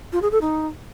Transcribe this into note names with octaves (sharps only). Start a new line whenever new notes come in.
F4
G#4
A4
D#4